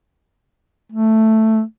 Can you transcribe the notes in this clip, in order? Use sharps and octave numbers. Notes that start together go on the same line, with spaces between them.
A3